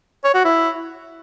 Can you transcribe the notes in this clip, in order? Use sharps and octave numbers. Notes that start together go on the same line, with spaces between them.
C#5
F#4
E4